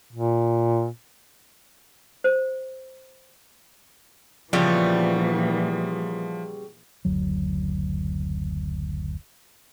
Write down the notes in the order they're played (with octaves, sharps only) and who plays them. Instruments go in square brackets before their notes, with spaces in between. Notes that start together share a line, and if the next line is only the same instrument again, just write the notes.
[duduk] A#2
[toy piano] C5
[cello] A#2 E3 [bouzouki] C#3 G3 B3 [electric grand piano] F3
[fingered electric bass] F#1 D2 F#3